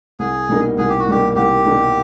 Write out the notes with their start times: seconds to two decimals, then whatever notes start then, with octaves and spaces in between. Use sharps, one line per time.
0.19 C2 G#4
0.48 B2 G3 A#3 D#4
0.78 C2 G#4
0.89 G4
1.00 F#4
1.06 B2 G3 A#3 D#4 G4
1.36 C2 G4
1.65 B2 G3 A#3 D#4